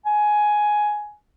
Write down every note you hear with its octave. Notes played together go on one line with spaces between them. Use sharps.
G#5